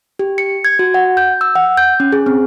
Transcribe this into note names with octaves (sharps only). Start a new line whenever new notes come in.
G4
C#7
G#6
F#4
F#5
G6
E6
F#5
G6
C#4
G#4
C4